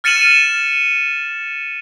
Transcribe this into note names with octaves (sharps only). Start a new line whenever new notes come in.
F6 A6 C#7 D#7 E7 F#7